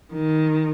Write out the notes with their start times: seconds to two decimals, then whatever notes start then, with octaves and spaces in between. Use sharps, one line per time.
0.13 D#3